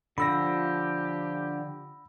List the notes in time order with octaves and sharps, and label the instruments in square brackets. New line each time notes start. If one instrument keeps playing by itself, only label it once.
[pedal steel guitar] D3 [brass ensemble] F3 F4 G4 [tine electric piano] B5 E6 A#6